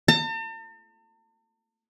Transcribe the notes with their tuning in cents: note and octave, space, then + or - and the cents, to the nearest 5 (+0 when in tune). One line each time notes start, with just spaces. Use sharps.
A5 +45